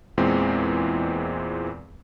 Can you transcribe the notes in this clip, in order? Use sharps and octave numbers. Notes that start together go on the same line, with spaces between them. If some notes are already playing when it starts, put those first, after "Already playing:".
E2 A#2 E3 G#3 C4